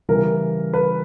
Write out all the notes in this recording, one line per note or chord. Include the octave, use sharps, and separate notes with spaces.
C#3 E3 G3 A#4
B4